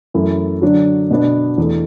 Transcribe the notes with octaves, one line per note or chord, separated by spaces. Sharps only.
F#2 E3 A3 E4
D3 F#3 D4 F#4
B2 B3 D4
E2 E3 A3